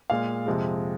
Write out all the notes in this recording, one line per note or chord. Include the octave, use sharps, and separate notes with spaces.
A#2 G#3 F5
F2 C3 F3 G#3